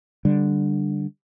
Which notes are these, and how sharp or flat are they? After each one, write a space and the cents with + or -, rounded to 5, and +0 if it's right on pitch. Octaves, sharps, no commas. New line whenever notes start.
D3 +0 G3 +0